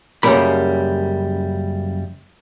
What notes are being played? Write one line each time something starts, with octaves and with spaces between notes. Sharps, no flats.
F#2 C#3 F3 G3 A#3 B5